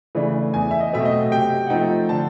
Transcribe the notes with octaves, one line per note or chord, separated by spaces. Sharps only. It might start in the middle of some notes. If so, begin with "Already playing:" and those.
C#3 E3 A3 D4
E2 G#5
E5
D#5
B2 F#3 A3 C4 E5
D#5
C3 G5
F#5
F3 A3 C4 D#4 G5
D3 A5